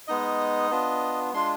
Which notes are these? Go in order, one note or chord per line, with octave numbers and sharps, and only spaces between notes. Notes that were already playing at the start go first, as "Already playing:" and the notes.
G#3 B3 D#4 D#5
B3 D4 F4
G#3 D4 F4 C6